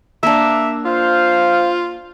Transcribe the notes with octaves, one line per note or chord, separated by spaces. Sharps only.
A#3 D4 E5
F4 C5 F5